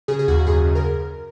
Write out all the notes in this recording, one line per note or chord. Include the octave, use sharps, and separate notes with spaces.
C#3 G#4
G#4
D#2 F#4
F#2 G#4
C#3
A#4